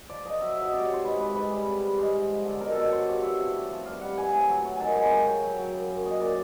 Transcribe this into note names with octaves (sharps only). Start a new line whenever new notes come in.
F3 D5
F3 D#5
F#3 E5
E5
F#3 D#5
C3 D5
C3 C#5
C5
G#2 B4
G#2 B4
G#2 B4
G3
C3
C3
G#2 C5
G#2
F3
D3
B2 A#4
B2 A4
C#5
G2 C5
G2 C#5
E3 E5
C3
A2
F3
G2 F5
G3 F#5
E3 G#5
G#5
A2
G#5
F#3
F#3
D#3 G#5 A5
G#2 G#5
C#3 G5
C#3 G5
F#3
F#3
F#2
F#2
A#2 D#5
A#2 D5